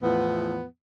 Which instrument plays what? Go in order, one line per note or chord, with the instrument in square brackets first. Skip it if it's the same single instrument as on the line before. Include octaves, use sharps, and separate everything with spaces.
[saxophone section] E2 A2 F3 B3